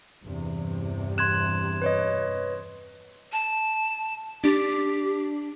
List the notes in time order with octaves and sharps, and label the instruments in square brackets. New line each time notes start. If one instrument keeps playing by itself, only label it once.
[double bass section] E2 G2 C3
[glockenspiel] C6 G#6 E7 [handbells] F#6
[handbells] B4 C#5 D#5
[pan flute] A5
[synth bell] D4 [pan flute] G4